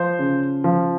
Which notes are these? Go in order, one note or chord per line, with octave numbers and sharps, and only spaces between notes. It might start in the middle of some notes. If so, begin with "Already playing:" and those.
Already playing: F3 C5
C#3
F3